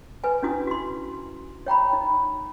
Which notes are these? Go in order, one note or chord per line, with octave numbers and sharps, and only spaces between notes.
B4 G#5
C#4 D4 E4 F#4 D#6
F#4 C6
C#5 G5 A#5 B5
D#4